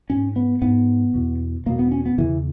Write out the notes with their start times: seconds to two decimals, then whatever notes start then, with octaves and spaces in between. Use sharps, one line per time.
0.10 G#2 C#4
0.36 B3
0.62 G#2 B3
1.14 E2 B2
1.66 E2 B2 A#3
1.79 B3
1.91 C#4
2.06 B3
2.18 E2 C#3 E3